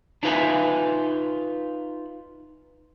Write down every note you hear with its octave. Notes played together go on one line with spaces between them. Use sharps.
D4 D#4 F4 B4 E5 G#5